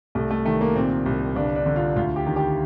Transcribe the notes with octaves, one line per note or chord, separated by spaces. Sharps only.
C2 A3
A3
D#3 A3
A#3
A#2 C4
C2
G1 D4
D4
D3
F4
D2 F4
G4
D#3
G4